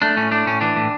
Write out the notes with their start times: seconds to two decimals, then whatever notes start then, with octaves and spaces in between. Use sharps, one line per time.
0.02 A3 D4
0.17 A2 C#4
0.31 A3 D4
0.46 A2 C#4
0.61 E3 D4
0.77 A2